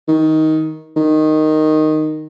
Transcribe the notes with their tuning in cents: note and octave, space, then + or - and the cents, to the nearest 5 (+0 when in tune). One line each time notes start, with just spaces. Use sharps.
D#3 +15
D#3 -5